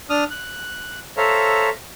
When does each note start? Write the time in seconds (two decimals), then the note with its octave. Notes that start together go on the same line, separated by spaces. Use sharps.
0.10 D4 D#6 F6
0.30 F#6
1.17 A4 C5 C#5 E5 F5 A#5